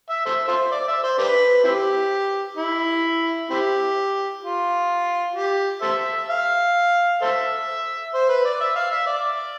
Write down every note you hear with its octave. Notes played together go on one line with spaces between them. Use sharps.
E5
A4 C5 E5
F4 A4 C5
D5
E5
C5
D4 G4 B4
C4 E4 G4
E4
C4 E4 G4
F4
G4
A4 C5 E5
F5
A4 C5 E5
C5
B4
D5
E5
F5
E5
D5